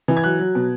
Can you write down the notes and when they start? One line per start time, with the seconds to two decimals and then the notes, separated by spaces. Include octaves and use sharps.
0.08 E3
0.17 G#6
0.24 F#3 F#6
0.40 F#3
0.55 B2